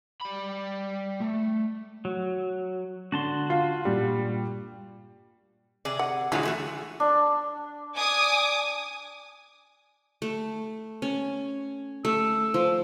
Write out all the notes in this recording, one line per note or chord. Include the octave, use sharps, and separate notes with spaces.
G3 B5
A3
F#3
D3 F#4 A5 C6
F4 F5 C7
G2 A#2 G3
C3 G#4 D5
F#5
A2 D3 F#3 G#3 F4 G#4
E3 A3 F#4
D4
G#5 D6 D#6
A3
C#4
A3 E6
F3